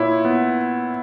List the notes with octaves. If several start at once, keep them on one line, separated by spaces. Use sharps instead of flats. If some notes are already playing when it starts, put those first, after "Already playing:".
Already playing: A#2 E4 C#5
B3